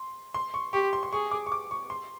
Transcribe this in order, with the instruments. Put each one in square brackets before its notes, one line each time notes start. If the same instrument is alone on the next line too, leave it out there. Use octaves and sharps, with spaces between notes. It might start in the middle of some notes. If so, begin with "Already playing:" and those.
Already playing: [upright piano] C6
C6
C#6
[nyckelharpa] G4 [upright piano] C#6
[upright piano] C6
C6
[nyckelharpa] G#4 [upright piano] C#6
[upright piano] D6
C#6
D6
C#6
C6